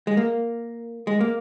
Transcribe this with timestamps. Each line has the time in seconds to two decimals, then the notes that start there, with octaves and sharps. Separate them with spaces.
0.07 G#3
0.17 A#3
1.07 G#3
1.21 A#3